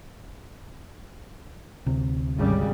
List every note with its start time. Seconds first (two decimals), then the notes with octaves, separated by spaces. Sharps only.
1.86 D2 C3
2.38 G#1 C#3 G3